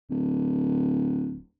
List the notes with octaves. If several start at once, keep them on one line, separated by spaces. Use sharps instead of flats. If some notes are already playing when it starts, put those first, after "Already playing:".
D1